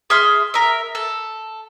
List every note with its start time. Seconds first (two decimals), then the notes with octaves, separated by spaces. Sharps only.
0.10 G#4 E5 C6 F6
0.54 A#4 E5
0.95 A4